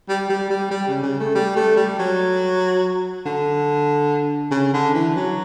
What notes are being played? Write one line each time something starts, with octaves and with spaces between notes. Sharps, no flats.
G3
G3
G3
G3
C#3
C#3
A3
G3
A3
G3
F#3
D3
C#3
D3
E3
F#3